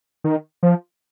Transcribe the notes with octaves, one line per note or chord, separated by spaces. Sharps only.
D#3
F3